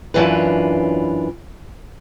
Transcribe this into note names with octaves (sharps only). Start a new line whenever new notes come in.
F#2 A2 E3 D4 F4 B4